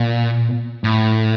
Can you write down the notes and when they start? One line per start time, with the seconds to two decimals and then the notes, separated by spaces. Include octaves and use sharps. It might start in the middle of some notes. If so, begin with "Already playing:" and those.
Already playing: A#2
0.84 A2